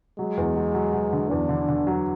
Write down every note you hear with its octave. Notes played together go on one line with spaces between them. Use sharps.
F#3 G#3
E2
F#3
F#3
F#3
D3
E2 D4
D3
D3
F#3